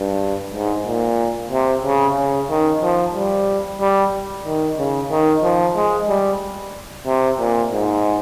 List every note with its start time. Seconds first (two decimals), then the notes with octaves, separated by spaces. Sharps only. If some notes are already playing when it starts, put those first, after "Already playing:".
Already playing: G2
0.54 G#2
0.87 A#2
1.52 C3
1.85 C#3
2.17 C#3
2.50 D#3
2.82 F3
3.14 G3
3.81 G3
4.45 D#3
4.79 C#3
5.11 D#3
5.43 F3
5.76 G#3
6.09 G3
7.07 C3
7.39 A#2
7.71 G#2